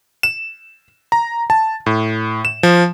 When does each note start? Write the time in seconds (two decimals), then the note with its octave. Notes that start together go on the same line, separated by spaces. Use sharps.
0.23 E7
1.12 A#5
1.50 A5
1.86 A2
2.45 E7
2.63 F3